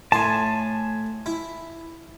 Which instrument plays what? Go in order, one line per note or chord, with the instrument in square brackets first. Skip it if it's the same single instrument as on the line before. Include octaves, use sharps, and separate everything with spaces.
[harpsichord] A2 C6 [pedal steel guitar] G#5 A5
[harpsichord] E4